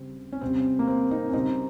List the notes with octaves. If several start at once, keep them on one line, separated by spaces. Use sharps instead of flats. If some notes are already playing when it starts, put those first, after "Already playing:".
Already playing: C#3 G3 C4
C#4
C3 G3 C4
A#3
C4
C4 D#4
C#4
C#3 G3 C4 D#4